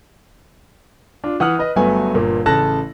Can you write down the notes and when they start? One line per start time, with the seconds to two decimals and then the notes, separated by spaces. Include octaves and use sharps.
1.24 D4 F4
1.40 E3 F#5 D#6 F6 F#6
1.59 B4 D#5
1.76 G1 G2 F#3 A3 B3 G#5
2.14 G1 A#2 A#3
2.46 A1 C#3 A4 A5 F#6 A#6